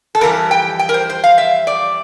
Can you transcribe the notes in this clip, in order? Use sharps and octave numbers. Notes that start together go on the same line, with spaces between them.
A4
F2 E3 G3 A#4
G5
G5
A#4
C5
C5
F5
E5
D5